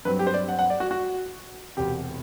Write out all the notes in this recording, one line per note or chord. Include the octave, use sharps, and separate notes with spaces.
G2 F#3 C4 B4
G4
C5
D5
F#5
F#5
D5
F#4
F#4
E1 E2 C3 G4